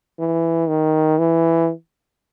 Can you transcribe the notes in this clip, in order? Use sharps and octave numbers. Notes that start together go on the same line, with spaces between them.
E3
D#3
E3